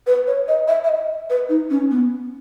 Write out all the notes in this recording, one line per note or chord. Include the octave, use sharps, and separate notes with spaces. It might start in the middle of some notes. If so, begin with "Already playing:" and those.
B4
C#5
D#5
E5
E5
D#5
B4
D#4
C#4
B3